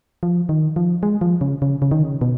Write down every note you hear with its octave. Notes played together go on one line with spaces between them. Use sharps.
F3
D#3
F3
G#3
F3
C#3
C#3
C#3
D#3
C#3
B2